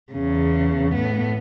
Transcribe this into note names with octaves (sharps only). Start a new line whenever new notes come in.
E2 C#3
A2 B3